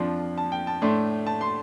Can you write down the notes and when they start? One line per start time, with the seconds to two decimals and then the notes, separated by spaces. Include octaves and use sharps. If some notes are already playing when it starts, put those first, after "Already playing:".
Already playing: F2 F3 D4 C6
0.38 A5
0.52 G5
0.67 A5
0.82 A2 A3 D4 C6
1.27 A5
1.41 C6